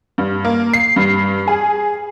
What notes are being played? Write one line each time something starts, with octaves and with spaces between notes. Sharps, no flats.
G2
A#3
C7
G2
G#4